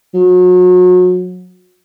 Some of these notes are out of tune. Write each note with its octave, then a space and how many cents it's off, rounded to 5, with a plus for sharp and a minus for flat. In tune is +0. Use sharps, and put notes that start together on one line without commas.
F#3 -35